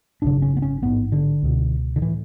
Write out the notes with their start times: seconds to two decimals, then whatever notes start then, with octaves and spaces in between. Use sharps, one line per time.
0.22 G#1 F#2 C#3 D4
0.42 C#4
0.57 B3
0.62 C#4
0.82 A1 G#2 B3
1.12 D3
1.43 C#2 B2
1.96 D3
2.02 A2 E3